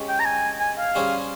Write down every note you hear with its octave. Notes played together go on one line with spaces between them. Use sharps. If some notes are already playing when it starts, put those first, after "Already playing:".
Already playing: G#3 C#4 G4
G5
A#5
G#5
G#5
F5
G3 C#4 G#4 C5